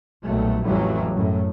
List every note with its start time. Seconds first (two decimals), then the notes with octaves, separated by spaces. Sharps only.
0.24 B1 A#2 F#3 G3 A3
0.62 A1 F2 A2 E3 F#3 G3
1.14 F#2 A2